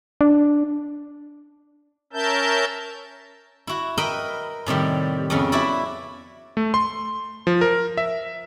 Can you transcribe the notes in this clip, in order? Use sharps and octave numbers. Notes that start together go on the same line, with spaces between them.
D4
C#4 A#4 E5 A5 G6
E4 F#4
A#4 B4 D#5 E5 G5 B5
A2 C3 D#3 G3
F2 C#3 B3
E4 F#4 D5 E5
A3
C6
F3
A#4
E5